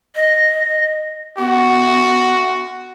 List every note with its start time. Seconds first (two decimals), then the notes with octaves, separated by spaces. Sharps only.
0.15 D#5
1.38 B3 F#4